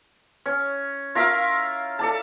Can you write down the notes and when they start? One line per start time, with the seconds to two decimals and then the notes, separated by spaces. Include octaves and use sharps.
0.46 C#4
1.15 F4 A#4 E5 F5
1.99 A4 D5 A5